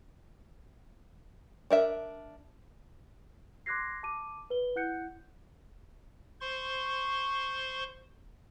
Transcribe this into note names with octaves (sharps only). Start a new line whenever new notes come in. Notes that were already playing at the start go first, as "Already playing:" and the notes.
D4 A#4 E5
C6 D6 F#6 G#6 A#6 C7
A5 D6 D#7
B4 G7
E4 F#5 F#6 G6 C#7
C5 C6 C#6